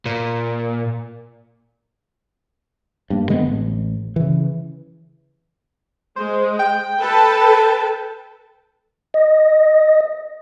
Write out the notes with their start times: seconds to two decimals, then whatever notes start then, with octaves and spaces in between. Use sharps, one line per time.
0.06 A#2
3.10 G2 A#3
3.29 D3 G#3 B3 C4
3.46 A1
4.16 C#3 E3
6.16 G#3 C5
6.59 G5
7.00 A4 B4 A5
9.14 D#5